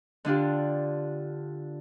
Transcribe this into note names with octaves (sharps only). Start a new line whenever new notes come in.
D3 D4 F4 G4